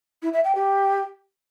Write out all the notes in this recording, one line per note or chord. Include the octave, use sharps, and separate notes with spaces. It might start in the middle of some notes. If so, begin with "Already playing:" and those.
E4
E5
G5
G4